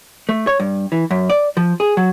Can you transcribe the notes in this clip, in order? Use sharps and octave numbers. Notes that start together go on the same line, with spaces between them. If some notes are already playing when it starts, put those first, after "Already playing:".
A3
C#5
G2
E3
F#2
D5
F3
G#4
F#3